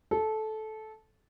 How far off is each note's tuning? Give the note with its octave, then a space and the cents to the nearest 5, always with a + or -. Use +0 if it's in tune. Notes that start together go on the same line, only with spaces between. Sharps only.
A4 -15